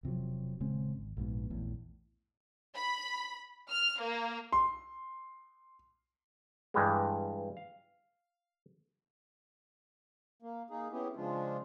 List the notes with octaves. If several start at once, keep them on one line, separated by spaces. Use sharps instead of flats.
E1 C3 F3 F#3
D#1 C#3 G#3 C4
G#1
A#1 G#2 B2
A#1 E2 A2
B5
F6
A#3
C6
G2 E3 G3 G#3
F5
A#3
A#3 D#4 G#4
B3 C#4 E4 G4 G#4
C#3 F3 G#3 D4 F4